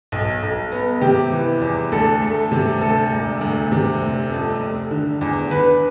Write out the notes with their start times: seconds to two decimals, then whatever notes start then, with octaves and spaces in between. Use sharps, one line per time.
0.12 B1
0.42 B1
0.72 B3
1.01 C3 G4
1.32 E3
1.61 E2
1.92 D2 A4
2.21 A3
2.52 C3
2.81 D2 A4
3.12 E1
3.41 D2
3.72 C3
4.01 F1
4.32 F2
4.61 F1
4.91 D3
5.21 E2
5.51 D3 B4